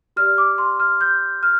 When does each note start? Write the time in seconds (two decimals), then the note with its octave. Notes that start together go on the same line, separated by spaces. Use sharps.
0.16 G4 D5 F6
0.38 D6
0.58 C6
0.80 F6
1.01 G6
1.43 F6